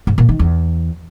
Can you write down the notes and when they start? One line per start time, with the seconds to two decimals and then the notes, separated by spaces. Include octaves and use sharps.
0.07 G#2
0.18 A#2
0.29 D#3
0.39 E2